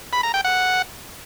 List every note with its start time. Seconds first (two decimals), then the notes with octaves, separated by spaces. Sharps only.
0.13 B5
0.23 A#5
0.34 G5
0.44 F#5